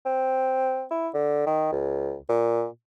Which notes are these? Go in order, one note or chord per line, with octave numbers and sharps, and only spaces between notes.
C4
E4
D3
D#3
C#2
A#2